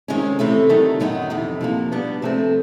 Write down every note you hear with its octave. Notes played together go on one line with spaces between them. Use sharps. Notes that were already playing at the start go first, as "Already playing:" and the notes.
C3 D#3 G#3 C#4
C3 E3 A3 C4
D2 C3 D#3 F#3 A3
F#2 D#3 F#3 B3 D#4
F2 C3 E3
C3 F3 A#3
B2 G3 B3 D4
C3 F3 A3 C4